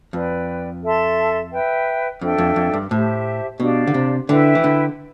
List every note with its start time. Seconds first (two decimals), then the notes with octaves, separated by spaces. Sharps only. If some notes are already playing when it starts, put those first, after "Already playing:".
0.13 F2 B4 D5 G5
0.83 A4 E5 A5 C6
1.51 B4 E5 G5
2.21 F2 D4 A4 E5 G5
2.38 F2
2.56 F2
2.74 G2
2.90 A2 G4 C5 E5 A5
3.60 B2 D4 G4 D5 F5
3.87 D3
3.94 C3
4.29 D3 E4 B4 E5 G5
4.55 E3
4.64 D3